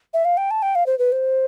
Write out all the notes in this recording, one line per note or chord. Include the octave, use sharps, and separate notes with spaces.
E5
F5
G5
A5
G5
F5
C5
B4
C5